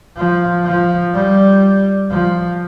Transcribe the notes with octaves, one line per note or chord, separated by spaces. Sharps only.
F3
F3
G3
F3